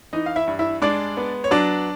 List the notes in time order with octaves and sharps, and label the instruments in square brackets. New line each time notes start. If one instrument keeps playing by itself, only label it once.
[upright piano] E3 D#4 D#5
F5
E4 E5
G2
E4 E5
G#3 D4 D5
B3
C#5
F#3 D4 D5